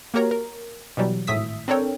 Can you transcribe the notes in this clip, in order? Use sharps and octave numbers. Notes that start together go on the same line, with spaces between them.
A#3 F#4 G4 A#4 C#5 A#5
A#4
B2 E3 F#3 G3
G#1 A2 E5 D#6 E6 B6
C4 D4 A4 A#4 C#5 G5